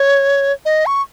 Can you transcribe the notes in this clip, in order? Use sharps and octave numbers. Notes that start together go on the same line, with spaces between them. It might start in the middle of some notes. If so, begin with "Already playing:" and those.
Already playing: C#5
D#5
C#6